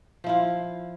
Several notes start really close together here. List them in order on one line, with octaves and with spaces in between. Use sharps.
F3 E4 F4